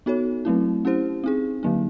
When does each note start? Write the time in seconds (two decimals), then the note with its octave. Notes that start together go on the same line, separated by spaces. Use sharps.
0.06 B3 D#4 F#4 A4 C#5
0.45 F#3 A3 C4 E4
0.85 C#4 E4 G4 C5
1.24 C4 D#4 G#4
1.63 D3 F#3 A#3 D#4